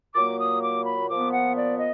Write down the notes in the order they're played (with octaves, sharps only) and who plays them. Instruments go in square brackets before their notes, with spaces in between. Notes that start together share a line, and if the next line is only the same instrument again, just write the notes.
[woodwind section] A#2 F#3 A#3 D6
D#6
D6
B5
A#2 F3 B3 D6
F#5
D5
D#5